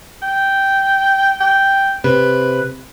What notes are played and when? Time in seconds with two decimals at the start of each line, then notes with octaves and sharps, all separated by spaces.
0.22 G5
1.40 G5
2.04 C3 B4